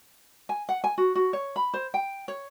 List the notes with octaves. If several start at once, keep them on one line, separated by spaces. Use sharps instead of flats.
G#5
F#5
G#5
F#4
F#4
C#5
B5
C5
G5
C#5